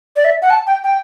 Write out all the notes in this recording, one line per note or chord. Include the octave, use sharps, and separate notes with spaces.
D5
E5
F#5
A5
G5
G5